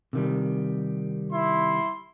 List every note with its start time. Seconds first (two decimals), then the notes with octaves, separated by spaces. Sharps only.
0.13 C3 D#3 G3
1.33 E4 C6